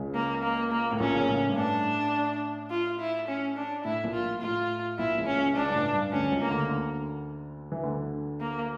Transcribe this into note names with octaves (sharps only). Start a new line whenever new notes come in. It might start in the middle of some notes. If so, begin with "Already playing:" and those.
Already playing: C#2 C#3
A#3
A#3
A#3
A2
A#1 A#2 C#4
C#3
A#2
A2
G2
A2 D4
F4
E4
C#4
D4
A2 E4
A#1 A#2
F4
A2 F4
A#1 A#2 E4
C#2 C#3
C#4
C#2 C#3
C#2 C#3 D4
G2
A2
G2
D2 D3 C#4
C#2 C#3
A#3
D2 D3
D2 D3
E3
D2 D3
A#3